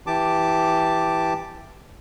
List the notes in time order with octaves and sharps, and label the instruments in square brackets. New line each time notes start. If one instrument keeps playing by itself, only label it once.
[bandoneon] E3 G4 A5 D6